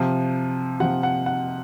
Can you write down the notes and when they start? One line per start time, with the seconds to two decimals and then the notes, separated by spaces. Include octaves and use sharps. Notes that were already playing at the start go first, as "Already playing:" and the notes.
Already playing: C3 F3
0.80 C3 F3 F#5
1.03 F#5
1.26 F#5